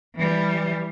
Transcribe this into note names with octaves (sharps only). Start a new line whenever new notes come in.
E3 G3